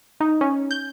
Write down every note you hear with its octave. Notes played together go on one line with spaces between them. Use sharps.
D#4
C#4
G6